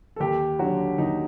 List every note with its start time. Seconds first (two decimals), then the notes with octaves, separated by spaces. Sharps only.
0.16 A4
0.20 D#2 G4
0.59 D3 F#3 F#4
0.98 D#2 D#4